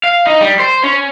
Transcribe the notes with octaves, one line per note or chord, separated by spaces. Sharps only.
F5
D#4
G3
C5
C#4